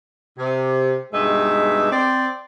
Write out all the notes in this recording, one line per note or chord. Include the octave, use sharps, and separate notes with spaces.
C3
G2 B2 G#3 D#4 E5
C4 D5